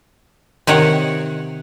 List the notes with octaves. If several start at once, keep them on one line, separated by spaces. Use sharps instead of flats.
C3 D#3 C#5 F#5